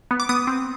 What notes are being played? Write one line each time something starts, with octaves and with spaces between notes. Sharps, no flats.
B3
D6
B3 D#6
C4